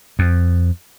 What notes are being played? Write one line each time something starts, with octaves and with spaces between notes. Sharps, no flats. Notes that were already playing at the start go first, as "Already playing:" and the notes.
F2